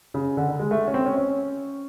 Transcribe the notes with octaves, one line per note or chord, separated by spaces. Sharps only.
C#3
D3
D3
G#3
A3
C#4
C4
C#4
C#4